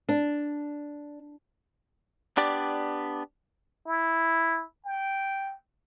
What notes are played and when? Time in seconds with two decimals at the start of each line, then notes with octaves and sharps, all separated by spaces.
0.09 D4
2.37 B3 D4 G4 D5
3.87 E4
4.85 G5